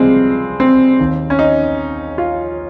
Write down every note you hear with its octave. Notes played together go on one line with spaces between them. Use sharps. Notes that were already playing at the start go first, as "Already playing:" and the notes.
Already playing: C#2 C3 F3 G3 G#3 C4
C4
D#2 D#3
C#4
D#4
F4